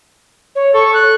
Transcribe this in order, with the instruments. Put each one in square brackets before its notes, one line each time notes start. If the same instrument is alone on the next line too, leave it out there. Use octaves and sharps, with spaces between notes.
[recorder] C#5
[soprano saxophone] A4 [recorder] C#6
[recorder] F#6